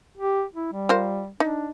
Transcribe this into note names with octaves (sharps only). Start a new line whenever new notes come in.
G4
E4
G3
F4 A#4 C5
D4 D#4